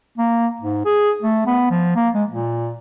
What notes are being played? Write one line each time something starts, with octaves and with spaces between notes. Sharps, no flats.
A#3
G#2
G#4
A3
B3
F3
A#3
G#3
A#2